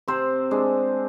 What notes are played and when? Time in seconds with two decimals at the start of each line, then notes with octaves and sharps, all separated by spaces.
0.08 C3 C4 C5
0.51 G#3 D4